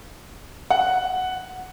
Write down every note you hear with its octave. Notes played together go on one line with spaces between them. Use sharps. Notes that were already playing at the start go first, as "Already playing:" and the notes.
F#5